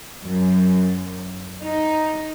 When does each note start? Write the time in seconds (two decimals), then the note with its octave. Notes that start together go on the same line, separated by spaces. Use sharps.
0.24 F#2
1.62 D#4